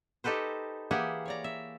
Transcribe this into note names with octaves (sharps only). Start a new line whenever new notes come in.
D#4 G4 A4 B4 C5
E3 A#3 G4 G#4 E5 F#5
C#5 D5 A#5
E5